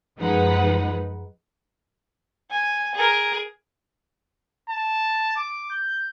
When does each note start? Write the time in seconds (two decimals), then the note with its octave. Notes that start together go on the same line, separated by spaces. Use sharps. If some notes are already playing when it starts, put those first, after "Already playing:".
0.17 F#2 F3 G#3 D#4 B4 F#5
2.50 G#5
2.94 G#4 A#4
4.70 A5
5.36 D6
5.71 G6